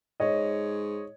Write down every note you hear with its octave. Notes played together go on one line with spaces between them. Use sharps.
G#2 C#5 D#5